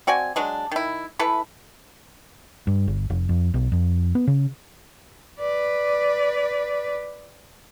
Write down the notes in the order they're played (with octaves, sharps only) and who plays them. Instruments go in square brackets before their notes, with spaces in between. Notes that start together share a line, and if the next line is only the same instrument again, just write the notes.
[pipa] C4 F#4 D5 G#5
F#3 G#3 D4
D#3 E4
E3 E4 A4 B4
[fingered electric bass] G2
G1
F1
F2
B1
F2
B3
C#3
[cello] B4 D5